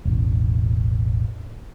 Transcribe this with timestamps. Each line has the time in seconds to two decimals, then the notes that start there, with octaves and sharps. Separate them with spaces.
0.05 E1 A1